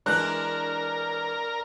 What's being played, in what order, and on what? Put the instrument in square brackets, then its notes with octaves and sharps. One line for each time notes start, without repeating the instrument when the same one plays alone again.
[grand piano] E3 G#3 [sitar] D4 [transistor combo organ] A#4 [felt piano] F#6